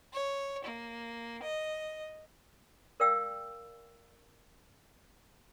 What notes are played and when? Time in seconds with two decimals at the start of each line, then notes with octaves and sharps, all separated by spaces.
0.13 C#5
0.64 A#3
1.43 D#5
3.00 A#4 D5 F5 G5 E6